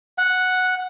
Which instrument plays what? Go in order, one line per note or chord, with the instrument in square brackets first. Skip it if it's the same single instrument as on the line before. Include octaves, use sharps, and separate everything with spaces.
[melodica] F#5